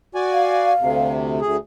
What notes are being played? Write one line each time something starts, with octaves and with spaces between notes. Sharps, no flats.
F#4 D5 G#5
F5
D2 C3
D2 G#4